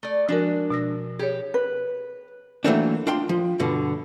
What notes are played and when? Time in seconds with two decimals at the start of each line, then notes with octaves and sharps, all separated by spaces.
0.03 A3 D5
0.28 F3 G#3 D4 F#4 A#4
0.70 B2 E6 A#6
1.19 G4 G#4 C#5
1.54 B4
2.64 E3 F#3 A3 A#3 C4 D4
3.07 D4 F4 G5 C6
3.29 F3
3.59 G2 B2 D3